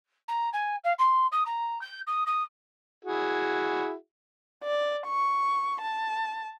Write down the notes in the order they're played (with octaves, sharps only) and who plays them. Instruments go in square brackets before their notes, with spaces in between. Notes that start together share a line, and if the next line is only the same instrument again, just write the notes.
[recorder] A#5
G#5
F5
C6
D#6
A#5
G6
D#6
D#6
[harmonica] E4 F#4 G#4
[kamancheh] D5
C#6
A5